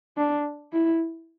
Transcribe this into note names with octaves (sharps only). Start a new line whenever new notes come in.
D4
E4